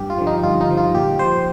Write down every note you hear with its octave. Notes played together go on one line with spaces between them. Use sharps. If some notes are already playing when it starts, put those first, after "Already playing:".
Already playing: G2 G4
F4
D3 F3
D#4
G2 F4
D#4
D3 F3
F4
A#2 G4
F3 C5